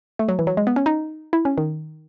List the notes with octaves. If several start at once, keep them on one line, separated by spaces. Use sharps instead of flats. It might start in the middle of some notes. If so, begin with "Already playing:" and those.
A3
F#3
E3
F#3
G#3
B3
C#4
D#4
E4
C#4
D#3